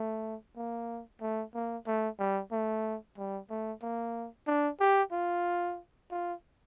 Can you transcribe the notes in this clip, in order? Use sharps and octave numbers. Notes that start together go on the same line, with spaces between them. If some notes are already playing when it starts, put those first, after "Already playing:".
Already playing: A3
A#3
A3
A#3
A3
G3
A3
G3
A3
A#3
D4
G4
F4
F4